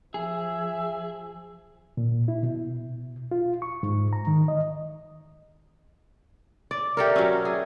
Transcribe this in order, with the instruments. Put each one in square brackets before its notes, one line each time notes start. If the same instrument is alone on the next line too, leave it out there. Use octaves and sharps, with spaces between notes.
[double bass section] F3 [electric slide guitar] G#4 [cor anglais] E5
[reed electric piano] A#2
E4
B2
F4
C#6
G#2
A#5
D#3
D#5
[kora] D5 [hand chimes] D6
[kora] G4 A4 A#4 [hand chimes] D5 E5
[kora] F#3 C#4 [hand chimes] E6
[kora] G#4